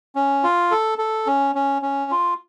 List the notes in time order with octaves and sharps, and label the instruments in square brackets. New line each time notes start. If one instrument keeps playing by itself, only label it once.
[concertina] C#4
F4
A4
A4
C#4
C#4
C#4
F4